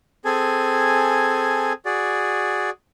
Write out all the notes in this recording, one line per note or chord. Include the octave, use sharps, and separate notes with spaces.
C4 G#4 A4 G#5
F#4 G#4 D5